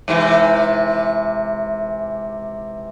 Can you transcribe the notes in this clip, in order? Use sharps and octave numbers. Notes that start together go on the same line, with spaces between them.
G#2 C3 E3